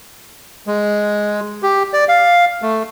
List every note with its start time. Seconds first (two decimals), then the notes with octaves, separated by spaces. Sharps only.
0.67 G#3
1.63 G4
1.93 D5
2.09 F5
2.62 A3